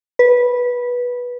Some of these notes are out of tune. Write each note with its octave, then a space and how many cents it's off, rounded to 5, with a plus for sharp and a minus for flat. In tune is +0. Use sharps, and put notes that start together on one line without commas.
B4 -15